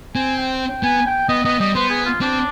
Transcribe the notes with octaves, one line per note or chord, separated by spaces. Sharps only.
C4 G#5
G5
B3 G#5
G5
B3 D#5
B3 D#5
G3 D#5
B3 C5
G#4
F4
C4 D4